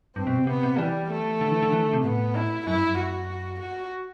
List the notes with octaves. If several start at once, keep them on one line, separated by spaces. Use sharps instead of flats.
G2 C4
B2
C3
C3 B3
C3
E3 G3
A3
D3
E3
D3
E3
D3
C3
A2 B3
E4
F#2 E4
G2
F#2
F#4
F#4